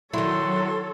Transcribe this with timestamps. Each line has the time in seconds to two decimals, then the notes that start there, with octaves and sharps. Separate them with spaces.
0.14 D#3 F#3 E4 A4 C#5 C6